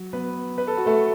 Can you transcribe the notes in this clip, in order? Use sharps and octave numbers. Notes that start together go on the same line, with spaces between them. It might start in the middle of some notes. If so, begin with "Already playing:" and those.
Already playing: F#3
B3 B4
B4
A4
F#4
A3 A4